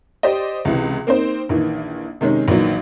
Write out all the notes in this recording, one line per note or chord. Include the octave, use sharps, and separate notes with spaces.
G4 C5 D5 D#5
C#2 C3 E3
A#3 C4 D#4 C5
A#1 D#3 E3
C3 D#3 G#3 C#4
A#1 D#3 E3 F#3